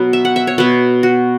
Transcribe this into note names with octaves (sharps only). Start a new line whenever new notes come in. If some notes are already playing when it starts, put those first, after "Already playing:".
Already playing: B2 F#3 B3
E5
F#5
E5
C#5
B2 B3 B4
F#4